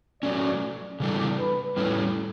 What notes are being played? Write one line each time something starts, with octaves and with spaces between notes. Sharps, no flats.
F#3 A3 C#4 D5
C#3 E3 G3 D4 A4
B4
A2 G3 C#4 E4 A4